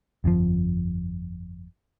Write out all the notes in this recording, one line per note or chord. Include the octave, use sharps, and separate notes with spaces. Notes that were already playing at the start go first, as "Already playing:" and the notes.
G1 F2 A2 F3